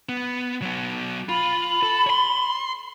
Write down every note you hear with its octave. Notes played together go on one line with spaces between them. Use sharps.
B3
F#3 B3
F4 B5
A4
C#5 C6